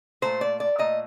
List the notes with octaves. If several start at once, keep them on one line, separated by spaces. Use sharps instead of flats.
A#2 A3 C5
D5
D5
A#2 A3 D#5